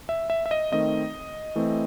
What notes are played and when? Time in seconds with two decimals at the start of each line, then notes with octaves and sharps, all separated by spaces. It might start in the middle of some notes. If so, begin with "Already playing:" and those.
0.09 E5
0.30 E5
0.46 E5
0.51 D#5
0.72 D#3 A3 C4 D#5
1.56 E3 A3 C4